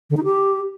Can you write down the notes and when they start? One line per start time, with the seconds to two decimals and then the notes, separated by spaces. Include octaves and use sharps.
0.10 D3
0.17 D#4
0.24 G4